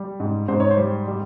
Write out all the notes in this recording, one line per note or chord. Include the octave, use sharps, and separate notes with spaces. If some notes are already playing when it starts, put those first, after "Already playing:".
Already playing: G3
G#2
G#2 C5
C#5
C5
G3
G3